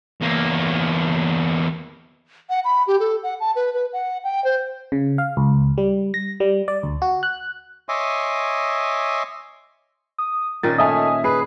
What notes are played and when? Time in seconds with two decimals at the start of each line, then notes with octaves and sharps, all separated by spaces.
0.21 E2 A#3
2.50 F#5
2.65 B5
2.87 G4
3.00 A4
3.23 F#5
3.40 A5
3.56 B4
3.74 B4
3.93 F#5
4.24 G5
4.44 C5
4.92 C#3
5.18 F5
5.37 C#2
5.78 G3
6.14 A#6
6.40 G3
6.68 D5
6.83 D2
7.02 F#4
7.23 F#6
7.89 C#5 D#5 E5 G#5 C6 D6
10.18 D#6
10.63 A#2 D#3 C#4 A6
10.78 A3 D#5 E5 G#5 D#6
11.24 G#4 B4 C7